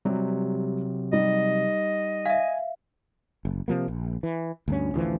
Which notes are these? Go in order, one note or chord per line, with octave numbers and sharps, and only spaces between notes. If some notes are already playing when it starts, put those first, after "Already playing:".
C3 F#3 G3
G3 D#4 D#5
E5 F5 G#5
F#1
C3 F3 A#3
A#1
E3
D2 G2 C#4
A1 D2 E3 F3